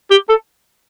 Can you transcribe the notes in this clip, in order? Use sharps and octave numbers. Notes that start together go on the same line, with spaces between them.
G4
A4